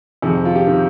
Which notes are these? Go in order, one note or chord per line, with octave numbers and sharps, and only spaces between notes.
F2 C3 D#3 G#4
F4
G4
C3 D#3